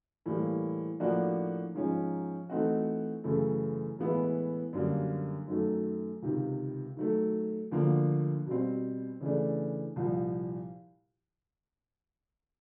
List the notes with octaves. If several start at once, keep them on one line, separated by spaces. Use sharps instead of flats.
A2 E3 G3 A#3
A2 F3 A#3 D4 F#4
G#2 F3 G#3 C#4
E3 A3 C4 D#4 F#4
F#2 C#3 E3 A3
A2 E3 G#3 B3 E4
F#2 D3 G3 A#3
F#2 D#3 F#3 A3
C#2 C3 D#3
D#3 F#3 A3
D2 D3 F3 A#3
B2 G3 C4
C#3 E3 A3 D4
C2 A#2 F3